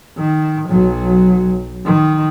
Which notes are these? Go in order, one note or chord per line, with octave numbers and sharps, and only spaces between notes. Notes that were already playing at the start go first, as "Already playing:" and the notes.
D#3
B1 F#3
D#3